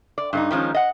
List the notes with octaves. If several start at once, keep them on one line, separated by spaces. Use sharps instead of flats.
D5
G2 A3 D#4
D#3 F3 G#3 C#4 D#4
D#5 F#5